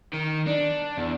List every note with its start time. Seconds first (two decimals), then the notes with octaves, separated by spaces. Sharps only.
0.14 D#3
0.48 D4
0.98 E2